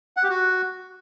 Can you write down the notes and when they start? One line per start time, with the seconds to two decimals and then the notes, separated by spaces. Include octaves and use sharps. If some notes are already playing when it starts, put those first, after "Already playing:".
0.17 F#5
0.23 G4
0.30 F#4